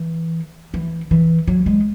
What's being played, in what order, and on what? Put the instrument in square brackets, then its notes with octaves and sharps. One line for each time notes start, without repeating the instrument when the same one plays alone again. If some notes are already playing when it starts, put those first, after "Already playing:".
Already playing: [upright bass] E3
E3
E3
F#3
G#3